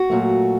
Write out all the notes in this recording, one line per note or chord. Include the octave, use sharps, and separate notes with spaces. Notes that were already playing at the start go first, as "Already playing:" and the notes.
Already playing: F#4
A#2 F#3 A3